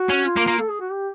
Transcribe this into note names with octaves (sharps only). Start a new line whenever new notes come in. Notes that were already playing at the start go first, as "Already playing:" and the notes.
Already playing: F#4
C#4
F4
A#3
A#3
A4
G#4
F#4
G4